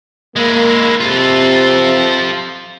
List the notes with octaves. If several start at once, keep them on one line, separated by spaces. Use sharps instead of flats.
G#3 A#3 E4
C3 F4 A4